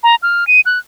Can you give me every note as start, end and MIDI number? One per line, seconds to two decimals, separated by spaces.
0.03 0.15 82
0.23 0.47 89
0.47 0.61 99
0.66 0.79 90